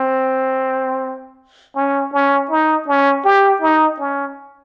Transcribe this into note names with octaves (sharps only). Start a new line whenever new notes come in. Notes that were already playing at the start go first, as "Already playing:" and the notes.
Already playing: C4
C#4
C#4
D#4
C#4
G4
D#4
C#4